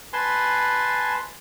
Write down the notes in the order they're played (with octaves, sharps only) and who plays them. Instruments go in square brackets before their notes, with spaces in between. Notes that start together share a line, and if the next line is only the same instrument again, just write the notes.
[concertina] B4 G#5 A5 C6